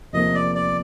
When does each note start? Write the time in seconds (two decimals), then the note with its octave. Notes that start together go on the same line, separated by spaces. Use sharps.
0.13 E2 C3 F3 A#3 D#5
0.35 D5
0.55 D5